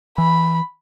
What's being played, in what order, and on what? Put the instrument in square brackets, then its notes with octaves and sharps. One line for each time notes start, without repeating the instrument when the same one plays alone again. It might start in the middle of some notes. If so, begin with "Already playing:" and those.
[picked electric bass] E3 [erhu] B5